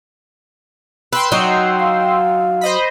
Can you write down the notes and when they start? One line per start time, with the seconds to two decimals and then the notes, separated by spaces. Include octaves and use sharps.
1.13 B4 G5 C6 E6
1.32 F#3 D#4 F#4
1.80 F5
2.61 C5 D#5 B5